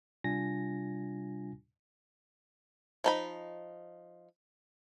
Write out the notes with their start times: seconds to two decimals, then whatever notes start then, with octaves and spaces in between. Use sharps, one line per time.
0.24 C3 G3 D4 F4 G#5 A#6
3.04 F3 D#4 B5